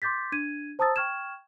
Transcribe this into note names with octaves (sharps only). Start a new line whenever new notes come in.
C6 D6 G6 A6 B6
D4 G#6 D#7
C5 A5 A#5 D#6 E6 A6
G5 C#6 F6 G#6 E7